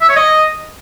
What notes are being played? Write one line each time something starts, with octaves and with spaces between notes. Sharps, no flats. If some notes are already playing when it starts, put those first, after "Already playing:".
E5
C#5
D#5